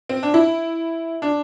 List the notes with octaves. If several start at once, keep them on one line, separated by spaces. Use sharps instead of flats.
C4
D4
E4
D4